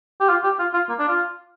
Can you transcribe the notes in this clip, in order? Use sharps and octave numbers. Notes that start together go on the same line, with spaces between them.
G4
F4
G4
F4
F4
A#3
D4
F4